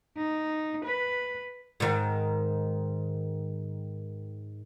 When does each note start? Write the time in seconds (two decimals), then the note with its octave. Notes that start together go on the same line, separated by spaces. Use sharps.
0.17 D#4
0.85 B4
1.80 G#2 D#3